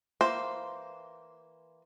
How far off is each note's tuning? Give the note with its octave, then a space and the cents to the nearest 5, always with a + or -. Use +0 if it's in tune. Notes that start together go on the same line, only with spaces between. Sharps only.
E3 +0 A#3 +0 C5 +0